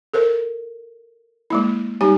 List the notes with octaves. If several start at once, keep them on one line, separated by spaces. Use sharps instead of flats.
A4 A#4 C5
G#3 A#3 E4
G3 D#4 G4 G#5